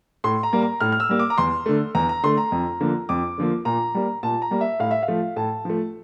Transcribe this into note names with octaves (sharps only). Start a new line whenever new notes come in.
A2 C6
A#5
G3 A#3
A#5
A2 F6
F6
E6
G3 A#3
D6
A#5
E2 C6
D3 A3
E2 A#5
A#5
D3 A3 C6
A#5
F2
D3 F3 A#3
F2 D6
D3 F3 A#3
A#2 A#5
G3 A#3
A#2 A5
A#5
G3 A#3
E5
A2 F5
E5
F5
F3 A3
A2 A5
F3 A3